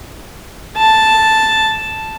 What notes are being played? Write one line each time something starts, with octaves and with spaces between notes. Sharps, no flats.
A5